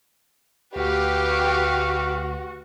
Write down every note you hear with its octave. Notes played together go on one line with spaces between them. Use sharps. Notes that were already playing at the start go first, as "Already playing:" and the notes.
D2 F#4 G4 B4 F5